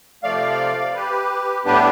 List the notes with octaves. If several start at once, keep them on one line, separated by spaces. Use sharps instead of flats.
C3 F3 A3 D5 F5
G4 B4
A2 G3 B3 D4 G4 B4